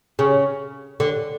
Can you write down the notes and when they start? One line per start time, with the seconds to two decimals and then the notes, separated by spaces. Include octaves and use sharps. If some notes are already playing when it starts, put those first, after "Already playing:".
0.19 C#3
1.00 D3